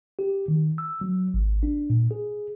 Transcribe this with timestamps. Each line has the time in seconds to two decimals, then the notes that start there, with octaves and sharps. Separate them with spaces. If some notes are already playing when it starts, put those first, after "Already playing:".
0.19 G4
0.48 D#3
0.78 E6
1.01 F#3
1.34 G#1
1.63 D4
1.90 A#2
2.11 G#4